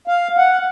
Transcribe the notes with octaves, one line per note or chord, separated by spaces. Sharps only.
F5
F#5